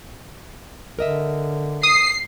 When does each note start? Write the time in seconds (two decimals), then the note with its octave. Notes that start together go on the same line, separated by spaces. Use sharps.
0.99 D3 A#4 D#5 E5
1.83 D#6 C7